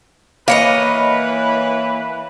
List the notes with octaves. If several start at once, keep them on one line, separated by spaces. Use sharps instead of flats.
E3 A#3 B4 C#5 D#5 F5